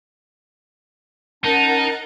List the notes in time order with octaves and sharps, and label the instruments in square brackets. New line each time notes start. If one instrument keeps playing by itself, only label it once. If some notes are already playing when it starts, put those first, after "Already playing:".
[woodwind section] C#4 A5 [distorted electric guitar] D#4 [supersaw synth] A#4 F#5 A6